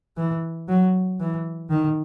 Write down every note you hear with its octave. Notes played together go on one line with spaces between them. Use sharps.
E3
F#3
E3
D#3